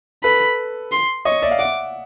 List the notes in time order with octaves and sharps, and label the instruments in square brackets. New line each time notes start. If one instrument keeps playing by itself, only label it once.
[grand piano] A4 B4 [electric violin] B5
[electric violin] C6
[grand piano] C#5 D#5 [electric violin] C#6
[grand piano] D5 E5
F5
[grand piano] E5 F#5 [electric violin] D6